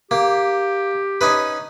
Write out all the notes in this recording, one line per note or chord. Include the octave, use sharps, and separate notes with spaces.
A#3 G4
C#4 D#4 B4